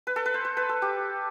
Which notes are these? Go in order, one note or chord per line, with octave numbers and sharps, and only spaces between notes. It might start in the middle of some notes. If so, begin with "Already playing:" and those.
B4
A4
B4
C5
C5
B4
A4
G4